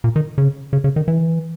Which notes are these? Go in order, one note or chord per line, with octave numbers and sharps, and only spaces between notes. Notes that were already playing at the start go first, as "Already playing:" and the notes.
A#2
D#3
C#3
C#3
C#3
D#3
E3